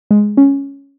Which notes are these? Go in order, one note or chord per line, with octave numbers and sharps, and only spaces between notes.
G#3
C#4